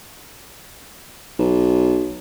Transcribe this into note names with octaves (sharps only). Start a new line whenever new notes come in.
B1